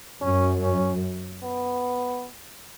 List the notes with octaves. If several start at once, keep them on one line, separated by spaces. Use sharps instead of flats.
F#2 C#4
C#4
B3